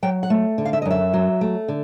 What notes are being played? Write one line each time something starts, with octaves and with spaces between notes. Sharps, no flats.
F#3 G5
F#5
A3
D3
F5
E5
D#5
F#2
E5
F#3
A3
D3